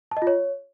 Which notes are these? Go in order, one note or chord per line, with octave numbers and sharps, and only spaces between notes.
A5
D#5
F4
C#5